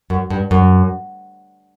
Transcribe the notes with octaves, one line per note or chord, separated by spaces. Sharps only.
F#2
G2
F#2